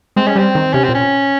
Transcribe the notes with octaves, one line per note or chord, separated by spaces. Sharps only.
G#3 C4
G#3 C#4
G3 C4
D#3
C3 C#4
A#2 C4
C#4